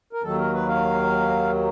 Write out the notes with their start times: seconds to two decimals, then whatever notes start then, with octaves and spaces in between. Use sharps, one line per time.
0.13 A#4
0.22 D#2 D#3 F#3 A4
0.38 A#4
0.53 B4
0.68 F5